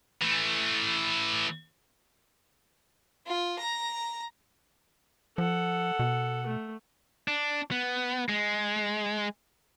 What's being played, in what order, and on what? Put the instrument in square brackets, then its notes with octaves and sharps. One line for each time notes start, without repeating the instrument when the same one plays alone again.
[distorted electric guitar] E3 A3
[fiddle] F4
A#5
[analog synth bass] F3 [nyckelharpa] A4 F#5
[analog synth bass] B2
[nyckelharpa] A3
[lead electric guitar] D4
B3
G#3